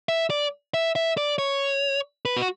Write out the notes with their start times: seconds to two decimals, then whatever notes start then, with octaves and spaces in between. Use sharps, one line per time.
0.09 E5
0.30 D5
0.74 E5
0.96 E5
1.17 D5
1.38 C#5
2.25 B4
2.37 F#4